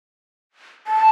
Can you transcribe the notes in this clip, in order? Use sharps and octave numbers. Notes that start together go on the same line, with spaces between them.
A5